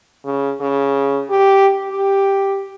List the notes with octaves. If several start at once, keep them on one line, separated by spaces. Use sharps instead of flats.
C#3
C#3
G4
G4